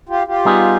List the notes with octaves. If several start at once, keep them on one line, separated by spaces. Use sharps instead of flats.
F4 G4
F4 G4
G3 B3 D#4 G#4